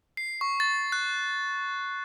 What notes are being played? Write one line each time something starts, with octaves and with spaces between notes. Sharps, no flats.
C7
C#6
A6
F#6